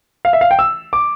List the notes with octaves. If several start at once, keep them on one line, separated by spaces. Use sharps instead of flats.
F5
E5
F5
G5
E6
D6